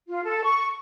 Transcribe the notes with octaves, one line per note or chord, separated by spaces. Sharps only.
F4
A4
C#6